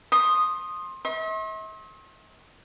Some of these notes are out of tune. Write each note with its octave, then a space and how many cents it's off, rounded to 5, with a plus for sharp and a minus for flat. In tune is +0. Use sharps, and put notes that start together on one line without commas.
C6 +25 D#6 -5
E5 -45 C6 +45